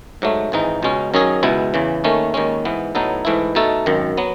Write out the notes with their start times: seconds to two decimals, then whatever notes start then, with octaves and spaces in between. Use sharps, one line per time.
0.22 G#2 F#3 A3
0.52 G#1 G#2 E3 G#3 D#4
0.83 C#2 B2 G#3 C#4
1.14 F#2 D#3 F#3 C#4 G#4
1.43 C#2 B2 G#3 B3 E4
1.74 E2 C#3 E3
2.04 D#2 D#3 A3 C#4
2.34 D#2 D#3 G#3 C#4
2.65 G#2 E3 B3
2.95 A2 F#3 B3 D#4 A4
3.25 G#2 E3 A3 E4
3.55 B2 A3 D#4 A4
3.86 G#1 F#2 D#3
4.18 F#3 B3